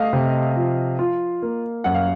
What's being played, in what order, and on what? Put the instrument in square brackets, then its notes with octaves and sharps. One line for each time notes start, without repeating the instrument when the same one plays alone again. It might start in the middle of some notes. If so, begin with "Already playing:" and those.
Already playing: [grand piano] A3 [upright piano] D#5 F5
[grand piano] C3
F3
F4
A#3
[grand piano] F#2 [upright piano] F#5
[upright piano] F5